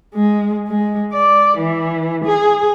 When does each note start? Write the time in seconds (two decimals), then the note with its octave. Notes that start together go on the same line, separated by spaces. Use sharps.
0.15 G#3
0.67 G#3
1.13 D5
1.58 E3
2.25 G#4